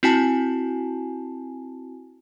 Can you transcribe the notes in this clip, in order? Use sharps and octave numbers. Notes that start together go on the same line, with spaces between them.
C4 E4 F#4 G#5 A5